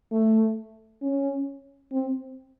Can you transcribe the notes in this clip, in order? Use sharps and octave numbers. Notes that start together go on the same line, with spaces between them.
A3
C#4
C4